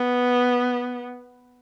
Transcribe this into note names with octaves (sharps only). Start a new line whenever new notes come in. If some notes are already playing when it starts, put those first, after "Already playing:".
Already playing: B3